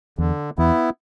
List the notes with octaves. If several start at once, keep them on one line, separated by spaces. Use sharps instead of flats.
E2 D3
E2 B3 E4